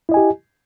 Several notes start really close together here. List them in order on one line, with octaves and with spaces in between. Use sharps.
E4 D#5 G#5 G4